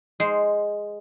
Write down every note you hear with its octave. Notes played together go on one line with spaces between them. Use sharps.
G#3 C5